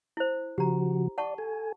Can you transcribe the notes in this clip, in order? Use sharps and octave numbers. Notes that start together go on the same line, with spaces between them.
E4 C5
C#3 F3 F#4 G4 A#5
D5 F#5 A5 C#6
A4 G#5